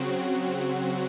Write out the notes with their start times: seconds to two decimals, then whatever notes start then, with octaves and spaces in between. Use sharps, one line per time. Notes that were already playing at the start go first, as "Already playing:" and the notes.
Already playing: C#3 F#3 C4 F#4